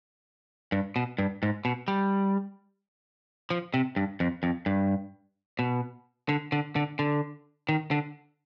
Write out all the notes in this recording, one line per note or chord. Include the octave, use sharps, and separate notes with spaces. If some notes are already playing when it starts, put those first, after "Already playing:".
G2
B2
G2
G#2
B2
G3
F3
C3
G2
F2
F2
G2
B2
D3
D3
D3
D3
D#3
D3